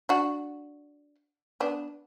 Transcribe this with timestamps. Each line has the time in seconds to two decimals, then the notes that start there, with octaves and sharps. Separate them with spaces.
0.09 D4 F#4
1.60 B3 D4